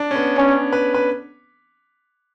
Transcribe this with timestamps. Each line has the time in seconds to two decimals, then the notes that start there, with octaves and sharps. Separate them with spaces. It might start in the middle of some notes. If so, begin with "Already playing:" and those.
Already playing: D4
0.11 C#4
0.15 B3
0.38 C#4
0.73 B4
0.94 B4